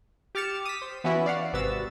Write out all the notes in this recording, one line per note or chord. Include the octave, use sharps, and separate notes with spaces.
G4 D6 F6 A6 C#7 E7
D#6 B6
C5
E3 B3 C#4 E4 F#4
D5 F5 F#5
G#1 C3 B3 F#4 E6 A6